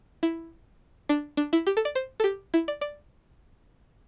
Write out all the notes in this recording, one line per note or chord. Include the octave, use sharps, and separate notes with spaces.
E4
D4
D4
E4
G4
A4
D5
C5
A4
G4
E4
D5
D5